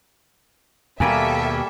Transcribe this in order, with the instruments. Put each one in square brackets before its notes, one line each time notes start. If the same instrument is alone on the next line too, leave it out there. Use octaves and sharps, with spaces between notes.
[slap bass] D#2 B2 [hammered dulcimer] G3 A#3 G#5 [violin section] G4 A4 E5